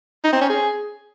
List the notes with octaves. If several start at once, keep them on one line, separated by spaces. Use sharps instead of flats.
D#4
C4
C#4
G#4